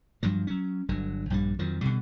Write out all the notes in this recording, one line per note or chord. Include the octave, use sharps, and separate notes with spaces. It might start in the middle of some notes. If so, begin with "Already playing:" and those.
G2 F3 F#3
F#3 C#4
G1 D3 F#3
A#1 G2 F3 G3
F2 D#3 F3 F#3
B2 D3 G3